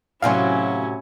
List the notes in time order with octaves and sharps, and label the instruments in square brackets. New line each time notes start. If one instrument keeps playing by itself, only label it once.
[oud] A2 C3 F#3 [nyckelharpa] C#4 E4 [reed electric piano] F5 G#5 C6